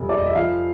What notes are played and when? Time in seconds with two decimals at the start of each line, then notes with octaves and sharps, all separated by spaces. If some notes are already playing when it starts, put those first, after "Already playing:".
Already playing: F1 G3
0.09 D5
0.18 D#5
0.26 E5
0.35 F3 F5